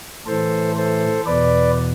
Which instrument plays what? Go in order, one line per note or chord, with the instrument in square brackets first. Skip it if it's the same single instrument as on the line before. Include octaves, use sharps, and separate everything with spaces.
[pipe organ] A2 E3 A4 C5
A4 C5
E2 B2 B4 D5